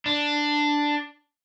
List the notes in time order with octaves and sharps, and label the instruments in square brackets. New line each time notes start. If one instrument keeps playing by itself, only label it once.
[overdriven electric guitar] D4